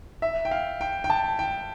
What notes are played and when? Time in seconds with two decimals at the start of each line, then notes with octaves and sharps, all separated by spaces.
0.22 E5
0.45 G5
0.51 F5
0.81 G5
1.04 G5
1.10 A5
1.39 G5